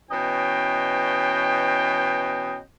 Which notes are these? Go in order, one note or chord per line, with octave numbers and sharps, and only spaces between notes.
B2 E3 C#4 D#5 G5